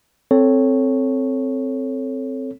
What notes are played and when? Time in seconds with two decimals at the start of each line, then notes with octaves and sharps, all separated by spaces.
0.31 C4 A4 C#5